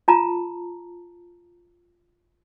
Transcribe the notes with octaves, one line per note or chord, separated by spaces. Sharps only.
F4 A5 A#5